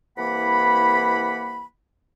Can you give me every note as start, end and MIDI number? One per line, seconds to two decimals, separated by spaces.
0.18 1.64 36
0.18 1.64 52
0.18 1.64 58
0.18 1.64 78
0.18 1.64 83